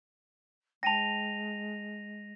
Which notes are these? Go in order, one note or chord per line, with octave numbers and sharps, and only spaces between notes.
G#3 G5 A5 A#6 D#7 F7